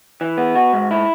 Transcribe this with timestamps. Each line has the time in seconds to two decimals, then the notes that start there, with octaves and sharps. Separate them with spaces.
0.21 E3
0.37 B3
0.55 F#4
0.73 G#2
0.91 E4